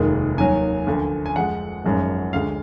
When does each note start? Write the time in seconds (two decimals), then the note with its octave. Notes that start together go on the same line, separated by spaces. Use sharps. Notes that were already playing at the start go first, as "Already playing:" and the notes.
Already playing: F1 D#2 D#3 G#3
0.37 D#2 D#3 F#3 G#5
0.87 D2 D3 F3
1.26 G#5
1.36 F2 F3 G#3 F#5
1.84 G#1 F#2 F3 G#3
2.33 D2 D3 G#3 F5